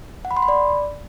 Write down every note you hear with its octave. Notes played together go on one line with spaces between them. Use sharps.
F#5
B5
C6
B5
D5